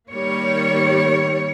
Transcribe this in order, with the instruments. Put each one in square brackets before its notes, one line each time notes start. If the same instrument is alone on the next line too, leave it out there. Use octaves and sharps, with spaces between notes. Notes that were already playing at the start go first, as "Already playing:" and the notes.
[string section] D#3 G3 A#3 C#5